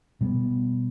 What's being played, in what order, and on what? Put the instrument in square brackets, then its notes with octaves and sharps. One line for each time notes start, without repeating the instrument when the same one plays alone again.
[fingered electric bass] B2 G3 A3 B3